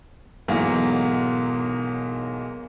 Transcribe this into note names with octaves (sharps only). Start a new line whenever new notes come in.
B1 G#2 B2 E3 F#3 A#3